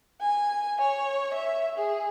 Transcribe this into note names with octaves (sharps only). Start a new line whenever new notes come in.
G#5
C#5
E5
G#4